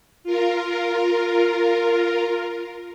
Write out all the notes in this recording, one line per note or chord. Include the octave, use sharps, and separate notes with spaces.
F4 A#4